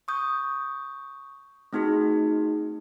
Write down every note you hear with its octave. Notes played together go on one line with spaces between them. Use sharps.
C#6 D#6 G6
A3 C4 D#4 F#4 G#4